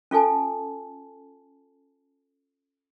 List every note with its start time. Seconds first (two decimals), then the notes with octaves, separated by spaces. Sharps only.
0.11 C#4 F4 A4 G#5 A5